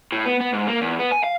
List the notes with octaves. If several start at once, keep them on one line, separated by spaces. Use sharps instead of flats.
A2
B3
B3
G#2
A#3
E2
B3
G#5
F5